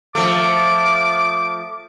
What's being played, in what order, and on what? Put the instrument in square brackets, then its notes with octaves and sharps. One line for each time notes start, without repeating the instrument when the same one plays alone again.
[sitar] F3 A3 [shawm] D6